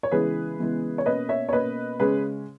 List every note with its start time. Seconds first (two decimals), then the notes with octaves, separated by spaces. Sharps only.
0.03 C#5
0.11 C#3 E3 G#3 B3 G#4 B4
0.59 C#3 E3 G#3 B3
0.98 C#5
1.06 B2 A#3 C#4 B4 D#5
1.29 C#5 E5
1.49 C#5
1.52 B2 A#3 C#4 B4 D#5
1.99 C#3 G#3 C#4 G#4 B4